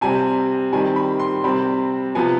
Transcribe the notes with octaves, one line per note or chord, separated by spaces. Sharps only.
C3 G3 C4 G#5
D#3 G3 C4 G#5
B5
C6
C3 G3 C4 B5
C3 F3 B3 G#5